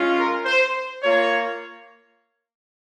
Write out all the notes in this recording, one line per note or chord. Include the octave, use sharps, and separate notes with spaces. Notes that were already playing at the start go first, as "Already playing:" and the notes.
Already playing: G#3 C#4 F4
A#4
C5
A#3 F4 C#5